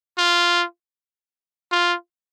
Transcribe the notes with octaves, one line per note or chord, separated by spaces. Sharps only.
F4
F4